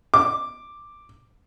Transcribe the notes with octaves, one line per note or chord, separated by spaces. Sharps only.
D6